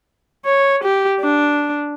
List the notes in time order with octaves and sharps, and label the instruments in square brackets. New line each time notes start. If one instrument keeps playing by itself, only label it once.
[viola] C#5
G4
D4